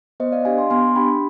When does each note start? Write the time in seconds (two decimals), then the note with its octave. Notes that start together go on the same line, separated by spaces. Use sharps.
0.20 B3 C5 D#5
0.32 D5 F5
0.45 D4 G4 F5 G#5
0.58 G#5 C6
0.70 B3 G#5 C6
0.96 D4 G4 G5 B5